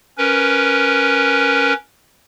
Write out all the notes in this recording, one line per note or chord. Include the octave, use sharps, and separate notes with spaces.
C#4 A#4 B4